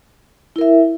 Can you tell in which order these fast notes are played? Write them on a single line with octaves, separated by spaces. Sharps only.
E4 A#4 E5